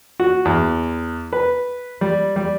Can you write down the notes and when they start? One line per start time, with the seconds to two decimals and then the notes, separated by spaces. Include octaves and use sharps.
0.20 F#4
0.45 E2
1.33 B4
2.01 G3
2.36 G3